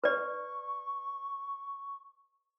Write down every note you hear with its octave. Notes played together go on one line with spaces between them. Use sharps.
B4 D5 C#6